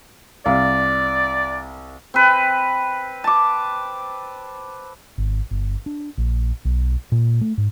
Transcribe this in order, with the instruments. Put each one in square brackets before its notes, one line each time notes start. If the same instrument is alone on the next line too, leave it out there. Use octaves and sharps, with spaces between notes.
[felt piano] C2 F5 [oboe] D5
[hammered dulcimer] C4 B4
A5 D6
[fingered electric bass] G#1
G1
D4
A#1
B1
A#2
A3
G#2